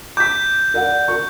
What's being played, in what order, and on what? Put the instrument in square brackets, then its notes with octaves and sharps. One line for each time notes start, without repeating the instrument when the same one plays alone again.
[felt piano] D6 B6 [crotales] G6
[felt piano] A#4 D5 F#5
A#4 C#6